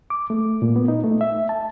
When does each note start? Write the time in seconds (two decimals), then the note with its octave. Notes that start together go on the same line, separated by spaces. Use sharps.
0.10 D6
0.30 A3
0.62 A#2
0.76 B3
0.88 D#4
1.04 A3
1.21 E5
1.49 A5